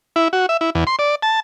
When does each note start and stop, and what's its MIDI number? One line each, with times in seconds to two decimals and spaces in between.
0.16 0.28 64
0.33 0.46 66
0.49 0.57 76
0.61 0.70 64
0.75 0.84 40
0.87 0.96 84
0.99 1.15 74
1.22 1.40 81